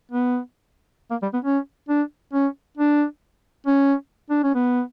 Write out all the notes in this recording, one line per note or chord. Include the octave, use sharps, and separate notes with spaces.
B3
A#3
G3
B3
C#4
D4
C#4
D4
C#4
D4
C#4
B3